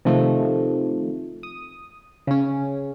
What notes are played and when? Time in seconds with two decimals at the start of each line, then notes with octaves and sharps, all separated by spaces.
0.05 C3 D#3 F3 A3
1.43 D#6
2.27 C#3 C#4